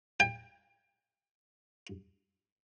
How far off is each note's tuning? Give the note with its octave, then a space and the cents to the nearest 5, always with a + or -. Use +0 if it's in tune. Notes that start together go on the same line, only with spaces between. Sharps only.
G5 +30